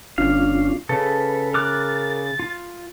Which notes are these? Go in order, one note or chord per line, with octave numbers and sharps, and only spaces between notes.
G1 C#4 D4 F4 F5
C#3 A4 B4
A#4 D6 F#6 A6
F4